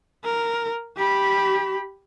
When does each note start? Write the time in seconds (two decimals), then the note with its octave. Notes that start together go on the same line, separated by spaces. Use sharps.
0.24 A#4
0.97 G4 B5